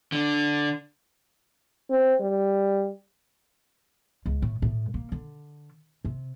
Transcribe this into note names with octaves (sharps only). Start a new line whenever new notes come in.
D3
C4
G3
C#2
A2
A2
A#3
D3
C3